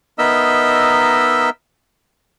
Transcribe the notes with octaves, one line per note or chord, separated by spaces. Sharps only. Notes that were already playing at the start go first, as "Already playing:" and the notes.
B3 D#4 A#4 D#5 E5 E6